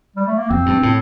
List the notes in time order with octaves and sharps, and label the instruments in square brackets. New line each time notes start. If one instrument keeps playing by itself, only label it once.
[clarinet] G3
A3
A#3
[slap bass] F2 [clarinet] C4
[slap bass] G2
A2